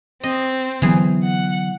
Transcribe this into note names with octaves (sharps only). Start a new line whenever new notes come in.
C4 D#5
D3 E3 F#3 B3 G#4
F#5